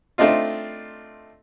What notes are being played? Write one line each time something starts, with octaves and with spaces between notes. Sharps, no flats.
A3 C4 D4 D#4 F4